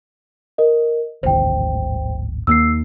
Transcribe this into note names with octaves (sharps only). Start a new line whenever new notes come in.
A#4 D#5
D1 G#1 D2 C5 G5
D#2 A#3 E6 C7